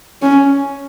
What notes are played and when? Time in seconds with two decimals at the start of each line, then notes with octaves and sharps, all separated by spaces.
0.22 C#4